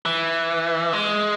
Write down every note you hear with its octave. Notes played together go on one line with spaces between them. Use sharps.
E3
G#3